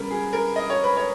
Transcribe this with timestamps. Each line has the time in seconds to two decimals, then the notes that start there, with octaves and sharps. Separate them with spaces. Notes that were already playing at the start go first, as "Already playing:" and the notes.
Already playing: C#3 G3 B3 A#4 B4
0.11 G#4
0.33 A#4
0.56 D#5
0.70 C#5
0.84 B4
0.97 C#5